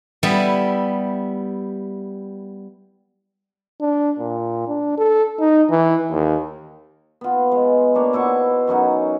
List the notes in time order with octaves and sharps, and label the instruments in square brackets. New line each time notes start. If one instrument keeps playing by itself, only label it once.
[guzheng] G3 B3 E4
[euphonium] D4
A#2
D4
A4
D#4
E3
D#2
[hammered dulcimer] B3 F4
G#3
A#3 D4 C#5
B2 E4 C5 C#6
F#2 F#3 C#4 D#4